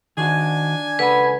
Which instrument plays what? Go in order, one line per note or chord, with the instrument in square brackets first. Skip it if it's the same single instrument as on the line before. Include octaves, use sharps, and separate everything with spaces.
[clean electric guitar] D#3 F#4 [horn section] D4 G#5
[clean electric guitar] C#2 A4 F#5 [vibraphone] B4 B5